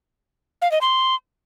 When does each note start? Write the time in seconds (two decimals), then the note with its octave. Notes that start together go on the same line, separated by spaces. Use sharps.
0.62 F5
0.72 D#5
0.81 C6